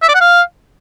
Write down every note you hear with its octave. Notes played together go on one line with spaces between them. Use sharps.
E5
D5
F#5
F5